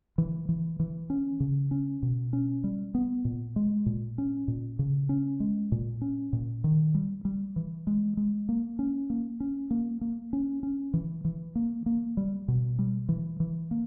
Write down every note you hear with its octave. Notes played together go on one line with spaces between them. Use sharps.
E3
E3
E3
C#4
C#3
C#4
B2
C#4
G3
B3
A#2
G#3
A#2
C#4
A#2
C#3
C#4
G#3
A#2
C#4
A#2
D#3
G3
G3
E3
G#3
G#3
A#3
C#4
A#3
C#4
A#3
A#3
C#4
C#4
E3
E3
A#3
A#3
G3
B2
G3
E3
E3
A#3